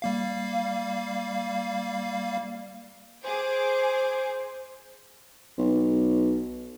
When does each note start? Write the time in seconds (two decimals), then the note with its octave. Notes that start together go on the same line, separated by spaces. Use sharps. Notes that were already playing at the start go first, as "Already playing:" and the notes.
0.02 G3 A#3 F5
3.24 G#4 C5 D6
5.58 B1